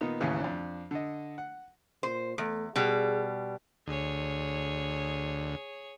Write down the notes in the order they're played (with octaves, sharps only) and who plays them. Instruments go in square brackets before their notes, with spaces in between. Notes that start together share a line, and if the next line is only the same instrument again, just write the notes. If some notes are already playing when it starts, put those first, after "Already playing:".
[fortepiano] A#2 D#3 B3 D#4
A1 D#2 C#3 E3
F2 D4
D3 D#5
F#5
[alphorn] A#2 [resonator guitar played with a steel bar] C5
[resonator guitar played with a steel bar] E2 [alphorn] A3
[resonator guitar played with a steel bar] B2 G3 [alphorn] G#4
[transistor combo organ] D2 [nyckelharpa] G#4 C#5